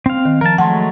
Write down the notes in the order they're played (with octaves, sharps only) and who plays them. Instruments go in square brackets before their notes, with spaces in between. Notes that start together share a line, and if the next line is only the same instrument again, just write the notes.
[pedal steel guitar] C4 F5
[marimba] D#3
[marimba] F3 [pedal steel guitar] A#4 A5
[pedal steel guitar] F#3 G#3 A3 [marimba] F#5 A5 C6